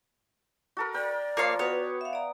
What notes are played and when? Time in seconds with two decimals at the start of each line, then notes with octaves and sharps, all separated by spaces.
0.77 F#4 A4 A#4
0.94 A#4 D5 G5
1.37 F3 A#3 C#5 F5 D6
1.59 B3 F#4 B4 C#5
2.01 E5 F5
2.13 D5 A#5